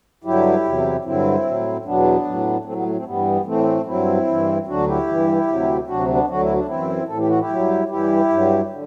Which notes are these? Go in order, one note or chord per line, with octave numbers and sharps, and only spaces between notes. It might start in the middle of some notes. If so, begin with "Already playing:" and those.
G2 D3 F#3 E4 G4
E2 C3 F#3
G2 D3 F#3 C4 E4
A2 F#3
E2 B2 F#3 B3 D4
A2 F#3
A2 F#3 A3 C4
G3 B3
A3
A3 C4
G2 E3 G3 B3
A2 E3 A3 C4
G2 F#3 C4 E4
G2 E3
D2 D3 F#3 D4 F#4
E4 G4
G2 E3
D2 C3 F#3
D2 C3 F#3 D4 F#4
C4
B3 D4
D2 D3 F#3 F#4
E4
D4
F#2 E3 C4 E4
A2 E3 A4
G4
F#4
E4 G4
G2 F#3
G2 E3 E4 G4
G2 F#3
D3